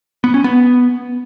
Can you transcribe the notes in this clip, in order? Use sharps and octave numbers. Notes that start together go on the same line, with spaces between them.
B3
C#4
B3